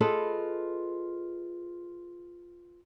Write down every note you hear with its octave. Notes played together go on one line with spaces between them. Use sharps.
F4 G#4 A4 B4 D#5